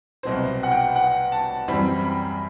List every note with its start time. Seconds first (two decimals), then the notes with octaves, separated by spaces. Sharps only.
0.23 C2 B2 F#3 C4 C5
0.63 F#5
0.72 G5
0.96 F#5
1.32 A5
1.68 F#2 E3 G3 C4 B5
2.04 B5